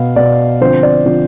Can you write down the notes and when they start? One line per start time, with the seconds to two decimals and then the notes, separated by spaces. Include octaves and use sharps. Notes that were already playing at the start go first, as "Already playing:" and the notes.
Already playing: B2 B3 F5
0.16 B2 B3 D5
0.61 D3 F3 C4 C5
0.83 D5
1.06 D3 F3 C4